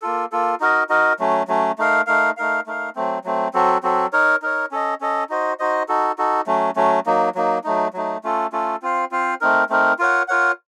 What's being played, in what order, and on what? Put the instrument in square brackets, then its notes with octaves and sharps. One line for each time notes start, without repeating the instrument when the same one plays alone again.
[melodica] A#3 F4 A4
A#3 F4 A4
D#4 F#4 A#4 D#5
D#4 F#4 A#4 D#5
F#3 A3 C#4
F#3 A3 C#4
A3 D#4 A#4 F5
A3 D#4 A#4 F5
A3 D#4 A#4 F5
A3 D#4 A#4 F5
F#3 A3 C4
F#3 A3 C4
F#3 C4 F#4 A4
F#3 C4 F#4 A4
D#4 A#4 C#5
D#4 A#4 C#5
C#4 A4 D#5
C#4 A4 D#5
D#4 F#4 C5 D#5
D#4 F#4 C5 D#5
D#4 F#4 A4
D#4 F#4 A4
F#3 A3 C#4
F#3 A3 C#4
F#3 A#3 D#4
F#3 A#3 D#4
F#3 A3 D#4
F#3 A3 D#4
A3 C#4 F4 A4
A3 C#4 F4 A4
C4 F4 C5 F5
C4 F4 C5 F5
A3 C4 D#4 A#4
A3 C4 D#4 A#4
F4 A#4 C#5 F#5
F4 A#4 C#5 F#5